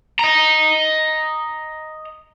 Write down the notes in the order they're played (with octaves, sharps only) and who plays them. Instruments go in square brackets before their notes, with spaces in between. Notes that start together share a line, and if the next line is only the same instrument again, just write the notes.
[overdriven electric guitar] D#5 A#5